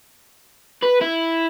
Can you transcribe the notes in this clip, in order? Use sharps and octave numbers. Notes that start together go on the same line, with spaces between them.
B4
E4